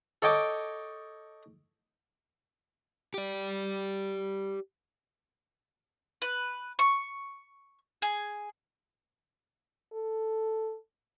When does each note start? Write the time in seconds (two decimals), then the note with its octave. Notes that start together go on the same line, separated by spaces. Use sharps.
0.22 A4 C#5 D#5 G5 D6
3.14 G4 D5
6.22 B4
6.79 C#6
8.02 G#4
9.93 A4